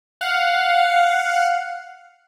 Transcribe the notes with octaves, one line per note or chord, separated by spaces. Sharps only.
F5 F#5